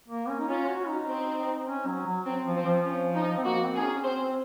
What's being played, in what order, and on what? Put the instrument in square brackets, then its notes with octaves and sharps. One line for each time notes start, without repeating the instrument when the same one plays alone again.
[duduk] A#3
C#4
D#4
[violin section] C#4 [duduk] F4
[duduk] F#4
D#4
[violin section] C4
[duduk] C#4
F#3
F#3
[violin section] C4
[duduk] F3
[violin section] C4
[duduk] F3
[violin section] C#4
D#4
[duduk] C4
[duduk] A#3 [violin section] F#4
[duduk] C4
[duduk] D#4 [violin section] G#4
[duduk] C#4
C#4
[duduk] C4 [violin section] C5
[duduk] C4